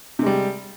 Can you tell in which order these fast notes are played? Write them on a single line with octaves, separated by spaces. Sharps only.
C3 G#3 G3